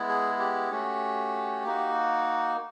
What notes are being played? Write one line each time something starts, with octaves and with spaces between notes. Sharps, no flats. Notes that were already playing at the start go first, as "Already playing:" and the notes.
Already playing: G#3 B3 E4
G#4
G4
A3 C#4 F#4
A#3 D#4 F#4